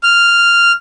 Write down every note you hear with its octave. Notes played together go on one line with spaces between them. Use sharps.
F6